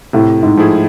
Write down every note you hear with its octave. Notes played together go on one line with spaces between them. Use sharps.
A2 C3
G#2
F3 A3 E4 G#4